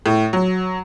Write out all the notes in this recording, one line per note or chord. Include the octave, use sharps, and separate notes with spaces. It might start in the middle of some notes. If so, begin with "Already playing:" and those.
A2
F#3